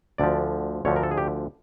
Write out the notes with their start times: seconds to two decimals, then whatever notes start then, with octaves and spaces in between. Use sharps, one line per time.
0.18 D2 D3 F3 D5
0.85 D2 D3 F3 C#5
0.96 A#4
1.03 A4
1.11 G#4
1.18 G4